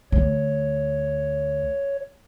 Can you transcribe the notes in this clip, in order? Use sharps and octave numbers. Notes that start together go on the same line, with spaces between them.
D2 C#5